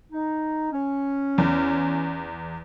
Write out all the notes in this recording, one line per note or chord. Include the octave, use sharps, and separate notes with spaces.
D#4
C#4
E2